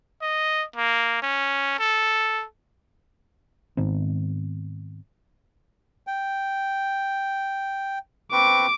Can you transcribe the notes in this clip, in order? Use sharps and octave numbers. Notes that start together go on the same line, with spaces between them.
D#5
A#3
C#4
A4
G#2 D#3 B3 C4
G5
C4 B4 C#6 D6